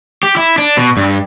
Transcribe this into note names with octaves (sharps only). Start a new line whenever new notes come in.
G4
E4
D4
B2
G2